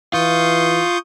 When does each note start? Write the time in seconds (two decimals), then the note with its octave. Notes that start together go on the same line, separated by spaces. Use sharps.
0.13 E3 F4 C#6 D#6 G6